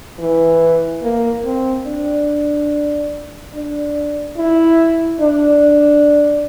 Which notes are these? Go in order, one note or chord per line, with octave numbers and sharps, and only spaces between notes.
E3
A#3
C4
D4
D4
E4
D4